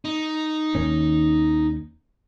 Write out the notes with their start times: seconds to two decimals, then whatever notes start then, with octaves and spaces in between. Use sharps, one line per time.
0.05 D#4
0.75 D#2 D#3 C#4